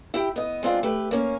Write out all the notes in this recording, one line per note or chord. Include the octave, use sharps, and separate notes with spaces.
E4 G4 G5
B3 D#5
G#3 C4 D4 F4
A3 G4 B4
A#3 C#4 C#5